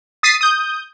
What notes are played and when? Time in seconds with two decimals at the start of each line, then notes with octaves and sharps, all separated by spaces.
0.23 D#6 A6 B6 C7 D#7
0.41 D#6 G6